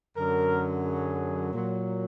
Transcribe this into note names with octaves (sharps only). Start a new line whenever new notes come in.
F#2 D3 F#3 A#4
G#4
A#2 F#3